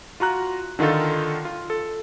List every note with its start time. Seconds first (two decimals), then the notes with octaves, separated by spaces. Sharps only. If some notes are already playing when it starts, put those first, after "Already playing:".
0.20 F4 F#4 A#5 F#6
0.79 D3 D#3 D#4 F4 A4
1.45 F4
1.70 A4